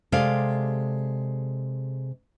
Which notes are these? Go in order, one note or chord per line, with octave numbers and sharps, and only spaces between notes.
C3 G#3 A4 D5 F5